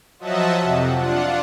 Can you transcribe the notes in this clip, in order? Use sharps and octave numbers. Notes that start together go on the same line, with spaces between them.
F3 F#3 D#5 E5 F#5 A5
F2 C3
D4 F4 F#5